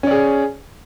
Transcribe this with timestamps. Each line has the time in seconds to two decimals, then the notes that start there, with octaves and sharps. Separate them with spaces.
0.03 C#4
0.07 D5
0.11 G#4